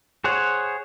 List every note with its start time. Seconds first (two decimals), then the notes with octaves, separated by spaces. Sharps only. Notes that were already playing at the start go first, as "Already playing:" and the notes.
0.24 G#4 C5 C#5 F#5